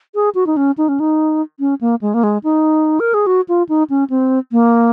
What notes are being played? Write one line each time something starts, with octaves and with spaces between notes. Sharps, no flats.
G#4
F#4
D#4
C#4
D#4
C#4
D#4
C#4
A#3
G#3
A#3
G#3
D#4
A#4
G#4
F#4
F4
D#4
C#4
C4
A#3